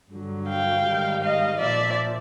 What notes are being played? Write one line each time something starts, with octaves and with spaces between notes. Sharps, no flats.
G2 D3 F#3
F5 G5
G#2 D#3 G3
D#5 F5
A#2 F3 D5 E5